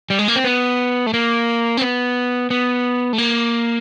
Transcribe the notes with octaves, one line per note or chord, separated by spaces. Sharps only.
G3
G#3
A#3
C4
B3
A3
A#3
C4
B3
B3
A3
A#3